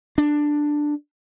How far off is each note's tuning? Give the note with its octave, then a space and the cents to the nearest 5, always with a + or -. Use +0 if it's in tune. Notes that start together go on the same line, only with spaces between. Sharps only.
D4 +10